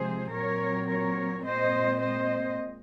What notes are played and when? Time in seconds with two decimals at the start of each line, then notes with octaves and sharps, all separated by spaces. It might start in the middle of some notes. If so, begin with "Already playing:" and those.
Already playing: C3 F3 G#3 G#4 C5
0.32 A#2 F#3 C4 A#4 C#5
0.88 A#4 C#5
1.44 A#2 G#3 C4 C5 D#5
2.00 C5 D#5